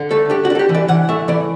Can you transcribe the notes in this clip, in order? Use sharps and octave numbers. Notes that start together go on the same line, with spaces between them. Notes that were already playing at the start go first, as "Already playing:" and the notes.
Already playing: D3
A3 A4
D4 G4
F#4
D4 A4
G4
E3
D5
E3 F#5
A3 E5
E3 D5